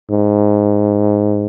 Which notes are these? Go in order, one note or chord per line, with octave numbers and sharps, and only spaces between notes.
G#2